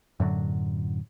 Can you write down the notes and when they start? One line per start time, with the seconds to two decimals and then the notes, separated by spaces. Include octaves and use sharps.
0.20 F#2 A2 D3 F#3